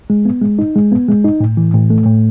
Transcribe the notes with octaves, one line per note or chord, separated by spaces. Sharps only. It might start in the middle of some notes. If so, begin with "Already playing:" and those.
G#3
B3
G#3
D#4
G#3
B3
G#3
D#4
A2
E3
A2
A3
A2